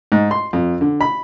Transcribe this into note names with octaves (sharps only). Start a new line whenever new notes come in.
G#2
C6
F2
D3
B5